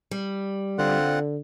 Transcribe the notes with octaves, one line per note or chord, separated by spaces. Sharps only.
G3
D3 C4 F4 F#5